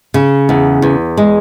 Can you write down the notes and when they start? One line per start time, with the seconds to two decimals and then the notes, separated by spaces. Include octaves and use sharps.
0.14 C#3
0.49 E2
0.82 E2
1.17 G#3